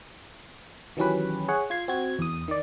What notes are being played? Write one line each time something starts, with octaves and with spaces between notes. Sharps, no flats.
D#3 E3 F#3 C#4 G4 B4
G#4 C#5 F#5
F4 G#6 C7
C4 F#4 G#6
E2 D#6
D#3 D5